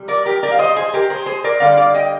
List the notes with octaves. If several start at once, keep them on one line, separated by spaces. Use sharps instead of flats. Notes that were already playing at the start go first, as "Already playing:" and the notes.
Already playing: C3 G3
A#4 D5
G4 A#4
A#4 D5
F5
C5 D#5
G#4 C5
G4 A#4
G#4 C5
G#4 C5
A#4 D5
D3 G3 D5 F5
D5 F5
D#5 G5